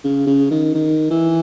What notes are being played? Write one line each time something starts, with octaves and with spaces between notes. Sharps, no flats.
C#3
C#3
D#3
D#3
E3